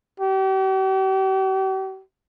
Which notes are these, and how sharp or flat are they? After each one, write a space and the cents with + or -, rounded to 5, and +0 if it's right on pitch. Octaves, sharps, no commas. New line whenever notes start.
G4 -45